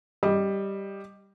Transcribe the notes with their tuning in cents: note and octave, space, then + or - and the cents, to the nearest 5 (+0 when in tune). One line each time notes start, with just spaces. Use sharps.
G3 +0 D#5 -5